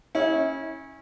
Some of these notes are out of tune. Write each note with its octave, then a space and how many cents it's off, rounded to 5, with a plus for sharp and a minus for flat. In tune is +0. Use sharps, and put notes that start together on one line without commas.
C#4 -15 E4 -35